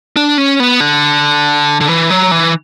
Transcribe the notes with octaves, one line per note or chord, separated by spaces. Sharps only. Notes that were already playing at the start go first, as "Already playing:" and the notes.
D4
C#4
B3
D3
D3
E3
F#3
E3